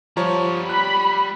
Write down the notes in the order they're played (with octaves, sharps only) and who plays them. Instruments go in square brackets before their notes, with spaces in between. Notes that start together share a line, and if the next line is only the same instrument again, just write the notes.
[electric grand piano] F3 C#5 [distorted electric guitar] G3 A#5
[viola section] B5 [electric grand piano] F#6